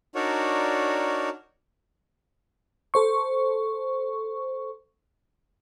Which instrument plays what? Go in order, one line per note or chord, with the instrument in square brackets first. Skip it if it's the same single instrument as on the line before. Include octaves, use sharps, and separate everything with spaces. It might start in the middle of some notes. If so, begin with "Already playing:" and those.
[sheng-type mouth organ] D4 D#4 F#4 A#4 C#5 D5
[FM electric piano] A4 C5 C#6